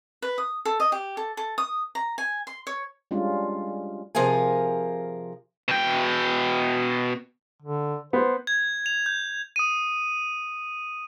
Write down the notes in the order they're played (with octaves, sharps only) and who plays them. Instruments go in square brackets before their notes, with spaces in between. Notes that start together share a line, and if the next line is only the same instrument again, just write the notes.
[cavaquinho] B4
D#6
A4
D#5
G4
A4
A4
D#6
A#5
G#5
C6
C#5
[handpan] G3 G#3 C#4 D4 F4
[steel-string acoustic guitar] C3 F3 G#4 A#4 F5 G#5
[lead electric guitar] B2 G5
[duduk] D3
[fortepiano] B3 [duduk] C5
[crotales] G#6
F7
G6
D#6 D#7